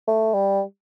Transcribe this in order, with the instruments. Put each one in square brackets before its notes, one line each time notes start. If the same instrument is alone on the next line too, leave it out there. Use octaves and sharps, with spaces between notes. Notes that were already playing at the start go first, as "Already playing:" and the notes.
[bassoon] A3
G3